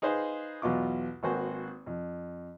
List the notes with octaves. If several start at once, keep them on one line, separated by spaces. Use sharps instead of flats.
D#4 G#4 B4 C5 F5
B1 E2 B2 F4 D6
G#1 A#3 F#4 B4 C5 G#5
F2